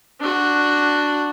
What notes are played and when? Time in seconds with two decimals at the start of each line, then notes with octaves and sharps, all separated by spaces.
0.21 D4 F#4